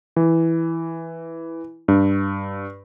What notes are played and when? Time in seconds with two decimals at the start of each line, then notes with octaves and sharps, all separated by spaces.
0.16 E3
1.88 G2